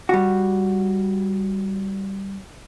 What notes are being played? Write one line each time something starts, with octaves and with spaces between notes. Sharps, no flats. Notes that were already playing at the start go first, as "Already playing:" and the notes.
G3 F#4